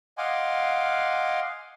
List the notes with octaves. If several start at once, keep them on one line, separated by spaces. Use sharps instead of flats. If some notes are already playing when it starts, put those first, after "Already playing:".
D#5 F5 F#5 G#5 C6 D6